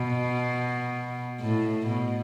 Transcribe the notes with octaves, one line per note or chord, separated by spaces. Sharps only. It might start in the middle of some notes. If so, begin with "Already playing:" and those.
Already playing: B2
A2
B2